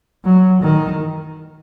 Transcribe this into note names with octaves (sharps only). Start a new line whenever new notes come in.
F#3
D#3